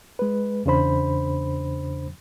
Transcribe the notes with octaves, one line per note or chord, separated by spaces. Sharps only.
G#3 B4
E2 C#3 D4 C5 B5